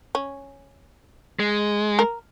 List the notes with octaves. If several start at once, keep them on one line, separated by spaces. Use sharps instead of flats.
C#4
G#3
A#4